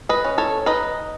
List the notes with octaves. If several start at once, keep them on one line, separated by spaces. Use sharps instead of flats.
B4 D#5
C#4
A4 C#5
D#4 B4 D#5